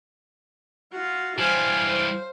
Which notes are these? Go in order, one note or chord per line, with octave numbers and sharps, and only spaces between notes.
F4 F#4
E3 G3 C5 F5 G#5
C5